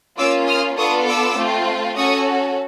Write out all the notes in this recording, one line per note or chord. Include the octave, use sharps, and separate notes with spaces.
A#3 C#4 F4 D6 E6
D#6 F6
B3 D4 F4 A4 C#6 D#6
D6 E6
A3 C4 F4
C#4 F#4 A4 C#6 D#6